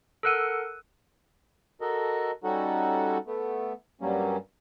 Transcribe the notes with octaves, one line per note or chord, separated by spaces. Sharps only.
A4 A#4 F#5 E6 F#6 D#7
F#4 A4 A#4 D#5
G3 C#4 D#4 F#4 A4 F#5
A3 B3
G2 F#3 G3 A#3 C#4